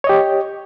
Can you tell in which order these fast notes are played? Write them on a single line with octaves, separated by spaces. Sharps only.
C#5 D#5 G4